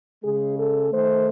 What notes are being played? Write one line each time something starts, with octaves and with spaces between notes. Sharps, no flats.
C#3 G#3 G#4
A4
D#3 A3 C5